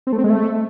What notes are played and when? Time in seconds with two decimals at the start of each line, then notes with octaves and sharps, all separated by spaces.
0.07 C4
0.13 A3
0.18 C4
0.24 G#3
0.30 A3